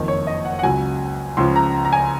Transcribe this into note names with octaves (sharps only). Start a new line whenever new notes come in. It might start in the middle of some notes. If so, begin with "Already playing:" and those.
Already playing: F#1 F2 D#3
C#5
D#5
F#5
F#5
C#2 C#3 F#3 G#5
C#2 C#3 F3 C6
A#5
A#5
G#5